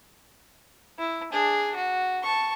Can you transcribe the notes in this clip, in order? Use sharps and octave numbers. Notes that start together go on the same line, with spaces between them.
E4
D4 G#4
F#4
A5 C#6